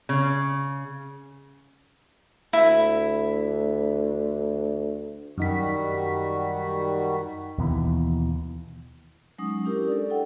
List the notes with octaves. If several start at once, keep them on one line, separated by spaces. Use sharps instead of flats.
C#3
D2 E4
F#2 D#3 G3 D#4 F#4 B6
D#2 B2 E3
F#3 G#3 C#4 D#4 D#6
C#4 D4 E4 G4 A#4
A4 D5
E4 A4 F#5 G5